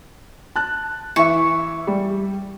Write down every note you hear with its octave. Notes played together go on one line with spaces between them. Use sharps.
A5 F#6
E3 E5 C#6
G3